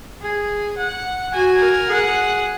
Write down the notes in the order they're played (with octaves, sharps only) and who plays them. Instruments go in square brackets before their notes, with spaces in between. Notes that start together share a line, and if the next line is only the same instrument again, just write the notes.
[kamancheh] G#4
F#5
[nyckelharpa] F#4 [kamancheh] G#5
[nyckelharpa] A#4
[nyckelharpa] G#4 [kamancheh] F#5